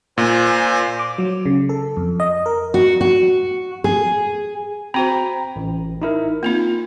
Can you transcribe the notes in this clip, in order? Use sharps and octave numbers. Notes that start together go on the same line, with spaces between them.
A#2 C5 G#5 C6
D6
F#3
C#3
A4
F2
D#5
A#4
F#4
F#4
G#4
C4 F#4 C5 G5 A#5 B5
A1
D#4 E4 A#4
A#3 C4 D#4 F4